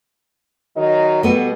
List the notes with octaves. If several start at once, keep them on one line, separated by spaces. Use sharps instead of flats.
D#3 F#3 D#5
B2 G3 A3 B3